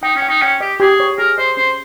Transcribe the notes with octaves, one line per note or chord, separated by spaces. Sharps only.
D#4 G5
C#4
G5
D#4
C#4 G5
G4 D#5
G4 G#4
C#5
G#4 A#4
C5 D#5
C#4 C5